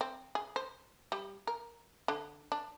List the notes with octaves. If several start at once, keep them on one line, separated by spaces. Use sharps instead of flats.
C4
G#4
C5
G3
A#4
D3
D4